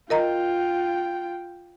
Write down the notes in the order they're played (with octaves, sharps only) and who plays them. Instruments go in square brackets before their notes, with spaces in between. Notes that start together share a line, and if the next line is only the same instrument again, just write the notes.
[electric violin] F4 G5 [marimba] A#4 D#5 A#5